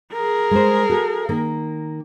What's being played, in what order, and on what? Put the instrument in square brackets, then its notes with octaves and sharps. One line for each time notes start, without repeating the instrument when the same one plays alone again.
[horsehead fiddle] G#4 A#4
[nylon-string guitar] G#3 C5
F#4 A4
D#3 A#3